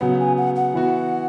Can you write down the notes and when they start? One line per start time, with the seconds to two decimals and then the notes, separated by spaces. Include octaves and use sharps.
0.01 C#3 F#3 B3 F#5
0.20 G#5
0.37 F#5
0.56 F#5
0.74 E3 B3 F#4